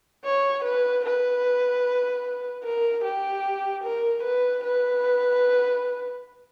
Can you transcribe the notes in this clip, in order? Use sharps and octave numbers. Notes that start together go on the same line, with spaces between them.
C#5
B4
B4
A#4
G4
A#4
B4
B4